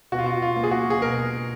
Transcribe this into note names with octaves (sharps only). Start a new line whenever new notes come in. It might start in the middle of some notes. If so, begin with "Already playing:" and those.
B2 F#4
F4
F#4
F4
A#3
G#4
F#4
G#4
B2 A#4